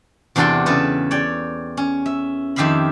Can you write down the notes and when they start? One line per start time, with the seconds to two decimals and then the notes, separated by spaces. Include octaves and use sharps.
0.36 E2 C3 D4 F#4 A4 G5
0.66 C#3 A4 B4
1.11 C#5 D5 G5
1.77 C#4
2.06 E5
2.56 F2 D#3 G4 E5 F5 B5